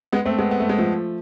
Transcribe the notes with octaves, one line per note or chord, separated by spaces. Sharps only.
G#3 B3
A3 C4
G#3 B3
B3
A3
G#3
F3 A3